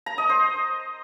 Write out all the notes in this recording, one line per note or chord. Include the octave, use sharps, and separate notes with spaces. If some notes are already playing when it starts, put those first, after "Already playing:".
A#5
D#5
C5